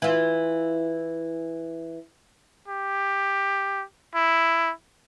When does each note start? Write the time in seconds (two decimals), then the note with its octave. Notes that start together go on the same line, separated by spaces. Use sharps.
0.02 E3 F4
2.68 G4
4.15 E4